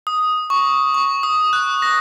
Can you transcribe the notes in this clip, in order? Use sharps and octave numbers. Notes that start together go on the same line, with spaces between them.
D#6
C#6
C#6
D#6
F#6
A#6